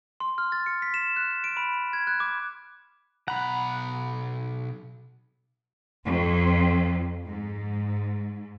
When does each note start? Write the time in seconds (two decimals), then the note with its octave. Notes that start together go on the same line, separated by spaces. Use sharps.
0.20 C6
0.38 F6
0.52 A6
0.66 C#7
0.82 B6
0.94 E7
1.16 F#6
1.44 D7
1.57 B5
1.93 G#6
2.07 F#6
2.20 D6
3.28 B1 F#5 A#5 B5
6.06 F2
7.24 G#2